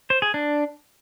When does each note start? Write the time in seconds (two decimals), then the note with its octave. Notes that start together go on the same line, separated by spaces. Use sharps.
0.10 C5
0.22 G#4
0.34 D4